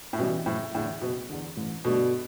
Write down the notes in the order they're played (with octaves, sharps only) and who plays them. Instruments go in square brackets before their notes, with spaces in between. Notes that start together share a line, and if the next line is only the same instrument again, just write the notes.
[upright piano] A2
[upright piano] B2 [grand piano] E3 G3 C#4
[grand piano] F#1 [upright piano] A2
[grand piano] E2 D3 [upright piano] A2
[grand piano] F#1 [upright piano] B2
[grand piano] E2 D3
A1
[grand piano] G2 D3 A3 D4 [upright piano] B2